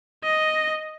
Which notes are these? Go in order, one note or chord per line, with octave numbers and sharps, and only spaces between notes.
D#5